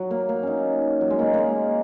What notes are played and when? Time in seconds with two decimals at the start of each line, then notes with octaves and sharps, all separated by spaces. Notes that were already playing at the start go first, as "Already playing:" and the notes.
Already playing: F#3
0.11 A#3
0.29 A#3
0.43 C#4 D#4
1.01 F#3
1.10 G#3
1.19 A#3
1.34 G#3 A#3